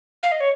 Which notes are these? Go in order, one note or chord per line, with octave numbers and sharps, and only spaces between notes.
F5
D#5
C#5